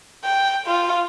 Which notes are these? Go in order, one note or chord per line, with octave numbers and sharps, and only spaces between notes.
G5
F4